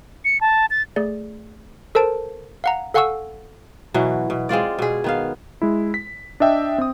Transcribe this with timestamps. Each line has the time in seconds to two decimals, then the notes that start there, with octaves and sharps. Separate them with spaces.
0.25 C#7
0.41 A5
0.70 A6
0.96 A3 G#4 D5
1.95 A4 A#4 C5 A5 D7
2.64 F5 F#5 A#5
2.94 A4 F5 F#5 G#5 C#6 E6
3.94 B2 E3 F#3
4.30 B2
4.49 G#3 C4 F4 D5
4.79 B2 G#4
5.04 D#3 B3 F5
5.62 G#3 E4
5.94 B6
6.40 D4 D#5 E5 G5
6.78 C4 D#6